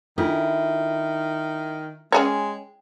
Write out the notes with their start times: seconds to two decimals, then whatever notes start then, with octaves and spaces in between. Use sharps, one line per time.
0.18 D#3 D4 E4 F4 A4
2.12 G#3 C#4 G#4 C#5 G5